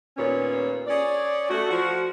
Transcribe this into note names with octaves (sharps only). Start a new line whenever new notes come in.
D#2 A#2 B3 C#4 C#5
C#4 G#4 D5
A3 F#4
F3 F#4